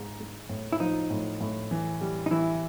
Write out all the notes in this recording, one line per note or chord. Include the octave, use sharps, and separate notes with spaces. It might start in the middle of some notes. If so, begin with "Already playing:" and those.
Already playing: G#2 G#3
G#3
A2
E4
F3 D#4
A2
A2
E3
G3
D#4
E3 E4